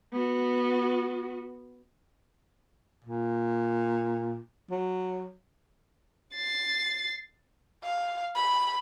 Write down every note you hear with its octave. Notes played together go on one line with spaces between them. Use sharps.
B3 F#4
A#2
F#3
A6 C7
F5
B5